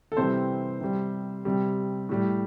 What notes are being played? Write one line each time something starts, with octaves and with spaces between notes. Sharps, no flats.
A4
C3 E3 G3 C4 C5
C3 G3
C3 G3
A2 G3